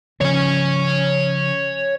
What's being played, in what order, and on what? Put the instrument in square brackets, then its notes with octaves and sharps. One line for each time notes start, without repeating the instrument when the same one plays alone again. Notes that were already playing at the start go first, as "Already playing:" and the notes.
[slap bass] C#3 F3 [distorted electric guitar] C#5 G#5